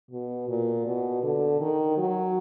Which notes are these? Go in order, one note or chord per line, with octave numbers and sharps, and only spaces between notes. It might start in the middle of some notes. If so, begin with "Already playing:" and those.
B2
A#2
B2
D3
D#3
F#3